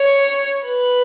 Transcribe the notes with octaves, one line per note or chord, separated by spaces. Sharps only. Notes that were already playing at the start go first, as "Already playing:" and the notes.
Already playing: C#5
B4